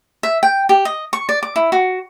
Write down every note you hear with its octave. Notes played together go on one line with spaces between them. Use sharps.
E5
G5
G4
D#5
C#6
D5
D6
E4
F#4